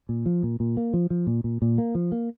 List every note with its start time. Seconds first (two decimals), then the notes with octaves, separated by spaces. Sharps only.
0.09 A#2
0.26 F3
0.43 A#2
0.60 A#2
0.77 A#3
0.94 F3
1.10 F3
1.27 A#2
1.44 A#2
1.62 A#2
1.78 A#3
1.95 F3
2.12 A#3